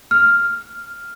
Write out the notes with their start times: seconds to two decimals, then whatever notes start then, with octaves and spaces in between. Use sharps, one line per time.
0.11 F6